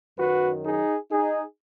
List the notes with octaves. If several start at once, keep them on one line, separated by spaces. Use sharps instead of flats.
F#2 D#3 F#3 F#4 B4
D#4 G#4
D#4 G#4